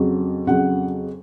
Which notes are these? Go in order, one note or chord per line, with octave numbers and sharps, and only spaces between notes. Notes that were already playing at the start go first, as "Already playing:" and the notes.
Already playing: F2 C#3 F#3
F2 C#3 F#3 F#5